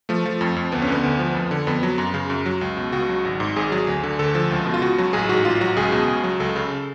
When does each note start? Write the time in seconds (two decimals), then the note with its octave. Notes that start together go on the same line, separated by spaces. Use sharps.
0.09 F3 A3
0.26 F3
0.41 F2
0.56 F2
0.72 D2 B3
0.82 C#4
0.87 D3 B3
1.03 D2
1.19 F3
1.35 F2
1.51 D3
1.67 F2 B3
1.83 F#3
1.98 F#2
2.14 C#3
2.30 F#2
2.46 F#3
2.61 C#2
2.77 B2
2.92 C#2 F#4
3.09 F#3
3.25 G#1
3.40 G#2
3.56 G#1 G#4
3.72 F#3
3.87 D2
4.03 D3
4.19 D2 A4
4.35 F3
4.51 C#2
4.66 B2
4.74 F4
4.82 C#2 F#4
4.98 F#3
5.13 A1 G#4
5.29 G#2 F#4
5.45 A1 F4
5.61 F#3 F#4
5.76 C#2 G#4
5.92 B2
6.08 C#2
6.24 F#3
6.40 C#2 A4
6.56 C#3